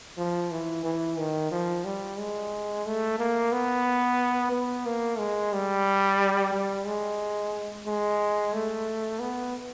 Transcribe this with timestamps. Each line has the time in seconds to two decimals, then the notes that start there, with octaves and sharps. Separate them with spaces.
0.18 F3
0.51 E3
0.84 E3
1.18 D#3
1.51 F3
1.85 G3
2.19 G#3
2.86 A3
3.19 A#3
3.52 B3
4.52 B3
4.86 A#3
5.19 G#3
5.53 G3
6.53 G3
6.86 G#3
7.87 G#3
8.53 A3
9.20 B3